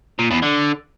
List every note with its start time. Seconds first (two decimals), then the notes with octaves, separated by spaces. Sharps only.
0.19 A#2
0.31 E2
0.43 D3